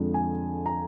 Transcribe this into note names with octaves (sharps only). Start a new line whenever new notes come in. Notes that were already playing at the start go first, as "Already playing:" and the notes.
Already playing: F2 D3 F3 G#3
G#5
A#5